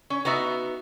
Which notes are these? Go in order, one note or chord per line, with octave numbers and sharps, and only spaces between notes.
C#4
B3 D#4 F#4 E5